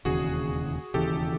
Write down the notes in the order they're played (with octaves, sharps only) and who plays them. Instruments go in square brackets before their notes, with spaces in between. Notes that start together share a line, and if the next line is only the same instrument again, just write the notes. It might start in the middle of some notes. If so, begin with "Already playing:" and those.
[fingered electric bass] E1 D#2 C#3 E3 [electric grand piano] F#4 G#4
[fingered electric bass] E1 D#2 C#3 E3 [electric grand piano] G4 A4